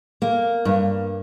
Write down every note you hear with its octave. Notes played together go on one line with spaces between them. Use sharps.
A#3
G2